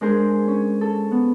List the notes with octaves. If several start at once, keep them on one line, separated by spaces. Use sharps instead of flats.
G#3 D4 G#4 A#4 C5
C#4
A4
B3